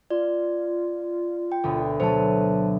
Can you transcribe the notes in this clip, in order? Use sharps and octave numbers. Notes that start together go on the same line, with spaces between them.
F4 D5
G5
D2 B2 B3
B2 F#3 A3 C5 A5